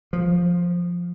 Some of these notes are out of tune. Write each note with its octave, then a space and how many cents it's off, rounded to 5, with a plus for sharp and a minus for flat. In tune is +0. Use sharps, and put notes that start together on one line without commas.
F3 +5